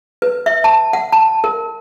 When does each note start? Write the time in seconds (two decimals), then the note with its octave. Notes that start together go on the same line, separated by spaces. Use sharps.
0.22 B4
0.46 E5
0.64 A5
0.93 F#5
1.12 A5
1.44 A#4